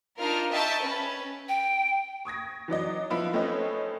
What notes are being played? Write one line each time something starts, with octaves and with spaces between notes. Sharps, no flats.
D4 D#4 F4 A#4 F6
D#5 E5 G5 A5 C#6
C#4 B4
G5
C#6 D#6 G#6 A#6
E3 F#3 D5 D#5
F3 B3 E4 F4
A3 C4 C#4 D#4 B4 D#5